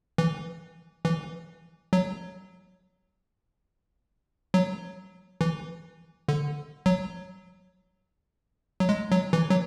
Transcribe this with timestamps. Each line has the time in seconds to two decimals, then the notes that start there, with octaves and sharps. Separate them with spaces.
0.18 E3
1.05 E3
1.93 F#3
4.54 F#3
5.41 E3
6.28 D3
6.86 F#3
8.80 F#3
8.89 G#3
9.12 F#3
9.33 E3
9.50 F#3